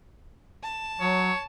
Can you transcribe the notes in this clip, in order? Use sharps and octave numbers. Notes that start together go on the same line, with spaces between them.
A5
F#3 C#5